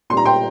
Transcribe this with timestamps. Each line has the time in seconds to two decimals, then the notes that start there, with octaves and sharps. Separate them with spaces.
0.10 A#2 C6
0.13 G3 A#5
0.25 G5 C6